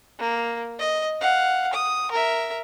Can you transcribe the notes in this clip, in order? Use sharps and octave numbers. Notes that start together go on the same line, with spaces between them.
A#3
D#5
F5 F#5
D#6
A#4 E5